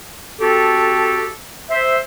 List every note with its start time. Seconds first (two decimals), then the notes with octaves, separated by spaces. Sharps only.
0.40 C4 F#4 G4 A4
1.70 C5 E5